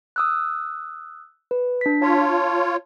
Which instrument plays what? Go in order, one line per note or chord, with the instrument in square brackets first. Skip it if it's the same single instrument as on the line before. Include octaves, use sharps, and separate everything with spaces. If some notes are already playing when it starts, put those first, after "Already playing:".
[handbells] D#6 E6 F#6
B4
D4 B6
[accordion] F4 C#5 [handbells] A5